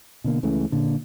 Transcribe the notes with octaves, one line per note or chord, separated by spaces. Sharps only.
B2 D3 A#3
C#2 C#3 E3 A3
A#2 D3